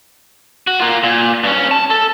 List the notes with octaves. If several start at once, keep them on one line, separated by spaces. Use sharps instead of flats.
F#4
A#3 F4
A#2
G2 C#4
A5
A4